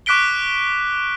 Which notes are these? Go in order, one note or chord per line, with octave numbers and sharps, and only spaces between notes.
C#6 D6 F#6 B6 D7 G7